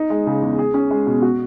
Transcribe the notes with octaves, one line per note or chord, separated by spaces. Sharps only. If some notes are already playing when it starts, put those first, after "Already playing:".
Already playing: D#4
G#3
C#3
E2
G#4
C#4
G#3
B2
F#4